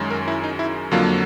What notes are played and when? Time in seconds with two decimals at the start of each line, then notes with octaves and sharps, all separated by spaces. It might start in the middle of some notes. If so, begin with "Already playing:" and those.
Already playing: F#2 D#3 G#3 C#4
0.10 A#4
0.28 E4
0.44 D#4
0.59 E4
0.91 F2 D3 F#3 A#3 F4